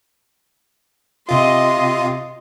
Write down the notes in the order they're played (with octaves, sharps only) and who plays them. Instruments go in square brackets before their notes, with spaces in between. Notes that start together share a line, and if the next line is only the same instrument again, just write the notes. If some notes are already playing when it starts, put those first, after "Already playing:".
[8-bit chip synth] C3 F4 [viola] D#5 C6